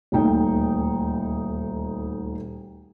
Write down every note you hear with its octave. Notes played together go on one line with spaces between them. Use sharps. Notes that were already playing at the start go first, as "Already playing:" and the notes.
D#1 D2 D#4 G5